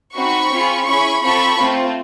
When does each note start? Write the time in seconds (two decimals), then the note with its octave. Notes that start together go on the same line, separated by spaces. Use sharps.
0.15 C4 D#4 F#4 B5 C#6
0.51 C4 F4 G#4
0.86 C#4 E4 G#4 B5 C#6
1.22 C4 F4 A4 B5 C#6
1.58 A3 C4 F4